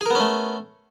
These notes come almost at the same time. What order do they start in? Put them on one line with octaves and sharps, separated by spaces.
G#4 A#4 B3 C#4 A3